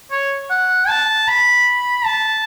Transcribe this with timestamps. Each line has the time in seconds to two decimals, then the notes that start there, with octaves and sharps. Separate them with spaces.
0.11 C#5
0.50 F#5
0.88 A5
1.28 B5
2.05 A5